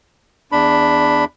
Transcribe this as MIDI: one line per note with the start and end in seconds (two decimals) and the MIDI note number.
0.52 1.25 40
0.52 1.25 62
0.52 1.25 83